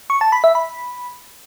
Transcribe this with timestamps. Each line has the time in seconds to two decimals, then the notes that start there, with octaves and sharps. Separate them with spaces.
0.10 C#6
0.21 A5
0.32 B5
0.44 E5
0.55 B5